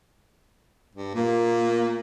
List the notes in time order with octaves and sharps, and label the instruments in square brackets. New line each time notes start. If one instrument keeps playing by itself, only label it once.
[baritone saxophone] G2
[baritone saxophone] A#2 [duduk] A#3